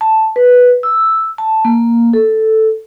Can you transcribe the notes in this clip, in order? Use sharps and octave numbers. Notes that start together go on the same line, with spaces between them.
A5
B4
E6
A5
A#3
A4